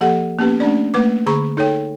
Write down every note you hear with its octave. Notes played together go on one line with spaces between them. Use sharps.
F3 A#3 G4 A4 F#5
A#3 B3 C#4 G4 B4
A3 C#4 D4 D5
A3 A#3 B4 D6
D3 G#4 A#5 B5 C#6
D#4 A4 C#5 G5